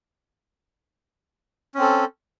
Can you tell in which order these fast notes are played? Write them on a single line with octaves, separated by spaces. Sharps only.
C#4 C4 A4